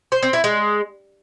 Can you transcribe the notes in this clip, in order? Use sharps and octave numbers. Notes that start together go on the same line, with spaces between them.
C5
C4
E4
G#3